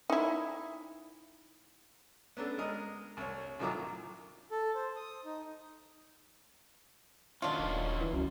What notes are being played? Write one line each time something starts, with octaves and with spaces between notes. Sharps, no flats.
D#4 E4
B3 C#4 D4 A4
G#3 A#4 D#5 D#6
C2 C#5
C2 A2 D#3 F#3 F4 D6
A4
C5
D#6
D#4
D#3 F#3 C#4 D4 F4
D#1
E3
C#2 F#2